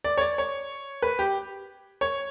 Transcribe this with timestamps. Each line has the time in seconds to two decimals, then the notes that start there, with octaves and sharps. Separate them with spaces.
0.04 D5
0.17 C#5
0.21 D5
0.38 C#5
1.02 B4
1.19 G4
2.01 C#5